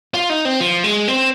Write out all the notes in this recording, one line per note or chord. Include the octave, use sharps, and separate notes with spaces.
F4
D#4
C4
F3
G#3
C4